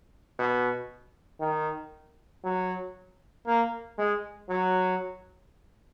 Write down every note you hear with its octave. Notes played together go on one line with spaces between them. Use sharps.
B2
D#3
F#3
A#3
G#3
F#3